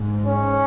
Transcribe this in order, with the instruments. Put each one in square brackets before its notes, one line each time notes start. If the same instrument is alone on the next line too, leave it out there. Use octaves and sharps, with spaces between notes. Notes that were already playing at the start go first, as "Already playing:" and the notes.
Already playing: [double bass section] G#2
[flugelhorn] C#4